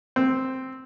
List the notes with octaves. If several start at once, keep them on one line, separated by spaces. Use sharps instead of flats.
C4